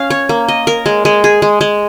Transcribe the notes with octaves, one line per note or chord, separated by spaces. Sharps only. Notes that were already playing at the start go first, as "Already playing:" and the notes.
Already playing: C#4 F5
C#5
A#3
D#5
A#4
G#3
G#3
G#4
G#3
G#3